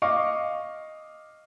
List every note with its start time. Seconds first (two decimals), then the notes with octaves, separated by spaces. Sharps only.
0.02 D#5 F5 C#6 D6